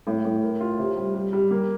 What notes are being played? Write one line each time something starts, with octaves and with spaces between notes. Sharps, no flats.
A2
A2
A#4
F4
C3
G3
G3
G3
A#3